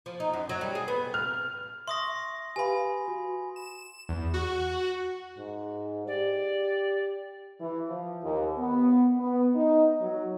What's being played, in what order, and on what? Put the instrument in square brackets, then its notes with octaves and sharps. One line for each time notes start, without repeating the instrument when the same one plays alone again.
[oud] F3
D#4
F#2
F#3
G3
G#4
B3
[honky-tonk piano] F6
[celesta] E5 C#6 [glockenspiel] C6 D#6 A#6
[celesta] G4 B4 F5 [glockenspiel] G#5 B5
[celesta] F#4
[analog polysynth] E7
E2
F#4
[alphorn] G#2
[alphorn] G4 [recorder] D5
[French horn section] E3
F3
D#2
B3
B3
D#4
F#3